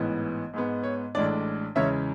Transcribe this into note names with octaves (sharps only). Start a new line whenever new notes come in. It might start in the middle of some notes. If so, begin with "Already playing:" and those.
Already playing: A1 G#2 E3 B3
G#2 G#3 B3
C#5
A1 A2 G#3 D4 D5
E2 C#3 E3 G#3 C#4 C#5 E5